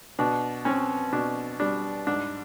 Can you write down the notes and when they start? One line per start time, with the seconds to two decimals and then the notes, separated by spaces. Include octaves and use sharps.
0.19 B2 D4
0.65 C4 C#4
1.12 B2 D4
1.60 G3 D4
2.07 G#2 D4